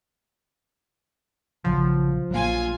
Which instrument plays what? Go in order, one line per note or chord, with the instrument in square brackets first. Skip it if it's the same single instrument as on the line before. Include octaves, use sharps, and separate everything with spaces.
[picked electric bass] A#1 C#3 F#3 [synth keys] F3
[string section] A#1 F4 G#5 [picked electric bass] F#3 A#3